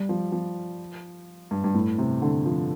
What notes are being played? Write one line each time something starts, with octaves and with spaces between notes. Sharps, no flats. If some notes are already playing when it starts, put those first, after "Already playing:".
Already playing: G3
F3
F3
G2
G2
A2
C3
D3
F3